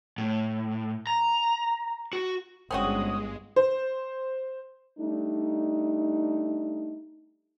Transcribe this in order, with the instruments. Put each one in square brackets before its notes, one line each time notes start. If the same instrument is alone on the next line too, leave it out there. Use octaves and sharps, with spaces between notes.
[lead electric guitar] A2
A#5
F#4
[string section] G1 G2 [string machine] G#3 [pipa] C4 C#4 F#4 [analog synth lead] D#6
[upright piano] C5
[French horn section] G3 A3 D4 D#4